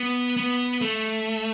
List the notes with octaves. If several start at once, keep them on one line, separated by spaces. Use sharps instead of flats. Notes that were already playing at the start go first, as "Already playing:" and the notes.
Already playing: B3
B3
A3